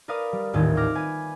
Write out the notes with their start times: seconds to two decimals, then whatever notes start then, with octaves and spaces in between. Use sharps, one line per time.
0.08 A#4 B4 D5 F5 D#6 F6
0.32 G3
0.53 D#1 A1 D#2 C4 G#6
0.77 G5 D6 F6 A#6
0.95 B4 G#5